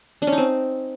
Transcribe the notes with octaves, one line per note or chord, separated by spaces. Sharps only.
D4
C#4
D#4
C4